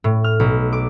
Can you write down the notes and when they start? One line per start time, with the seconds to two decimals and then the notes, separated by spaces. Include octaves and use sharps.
0.04 A2
0.24 F6
0.40 B1
0.73 D6